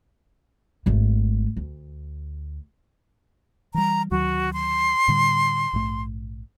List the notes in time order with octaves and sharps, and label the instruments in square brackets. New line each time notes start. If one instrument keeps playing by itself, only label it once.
[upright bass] G#1 A3
D2
[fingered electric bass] E3 G3 [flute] A#5
[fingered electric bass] D2 D#3 F#3 [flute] F#4
[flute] C6
[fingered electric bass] A2 D3 G3
A#1 G#2 A3